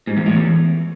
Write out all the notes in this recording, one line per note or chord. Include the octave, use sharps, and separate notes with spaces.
G#2
E2
A2
E2